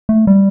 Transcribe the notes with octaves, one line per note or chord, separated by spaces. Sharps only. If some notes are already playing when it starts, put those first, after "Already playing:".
A3
G3